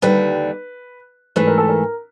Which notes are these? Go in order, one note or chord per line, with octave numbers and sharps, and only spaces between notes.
D#2 D3 G3 B4
G#2 E3 A3 B4
A#4
A4
A#4